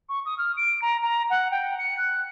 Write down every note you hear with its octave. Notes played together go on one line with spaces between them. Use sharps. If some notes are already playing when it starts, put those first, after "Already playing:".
C#6
D#6
F6
D7
A#5
A#5
F#5
G5
C#7
F#6